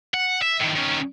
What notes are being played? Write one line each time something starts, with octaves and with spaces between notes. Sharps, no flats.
F#5
E5
A2 D#3
D#3 C#4